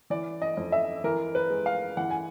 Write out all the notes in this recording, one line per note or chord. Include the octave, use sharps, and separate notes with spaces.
E3 D5
D#5
F2
E5
E3 A#4
B4
G#3
F5
E3 F#5
G#5